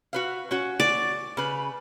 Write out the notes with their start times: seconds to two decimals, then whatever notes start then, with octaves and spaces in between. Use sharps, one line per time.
0.13 F#4 B4 F5
0.51 C#4 F#4
0.80 D5
1.37 C#3 B4